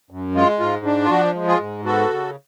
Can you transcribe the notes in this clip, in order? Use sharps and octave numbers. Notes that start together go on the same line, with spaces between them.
F#2
G#3 F4
G#2 F4
D4
F4
F3 F#4
G#3
F4 G#4
G#2
B3 F#4 A4
C#3